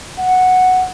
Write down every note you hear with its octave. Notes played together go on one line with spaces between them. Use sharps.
F#5